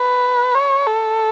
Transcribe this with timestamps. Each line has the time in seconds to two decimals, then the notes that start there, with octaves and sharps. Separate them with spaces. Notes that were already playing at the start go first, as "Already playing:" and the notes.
Already playing: B4
0.55 C#5
0.86 A4